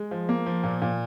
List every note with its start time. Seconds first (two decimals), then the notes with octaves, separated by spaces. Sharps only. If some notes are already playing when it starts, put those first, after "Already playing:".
Already playing: G#3
0.11 F3
0.29 A#3
0.46 F3
0.64 A#2
0.82 A#2